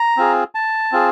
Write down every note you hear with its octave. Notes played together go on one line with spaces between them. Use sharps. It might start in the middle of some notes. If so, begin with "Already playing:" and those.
Already playing: A#5
C4 F4 G#4
A5
C4 F4 G#4